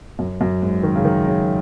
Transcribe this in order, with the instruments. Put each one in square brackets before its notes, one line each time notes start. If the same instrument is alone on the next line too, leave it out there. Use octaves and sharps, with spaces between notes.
[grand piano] F#2
F#2
G#2
D#3
C#3
D#3
C#3